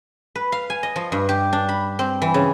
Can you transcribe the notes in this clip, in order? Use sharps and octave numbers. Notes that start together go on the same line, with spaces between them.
B4
F5
G#5
D#5
F3
G2
G4
D4
B5
C4
E3
C#3